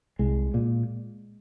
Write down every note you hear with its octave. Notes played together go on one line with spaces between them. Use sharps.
C2 G#3
A#2